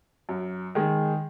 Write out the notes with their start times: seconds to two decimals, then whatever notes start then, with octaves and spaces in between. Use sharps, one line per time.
0.29 F#2
0.75 D#3 G#3